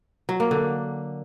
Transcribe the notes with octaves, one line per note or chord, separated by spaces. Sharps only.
F#3
A#3
D3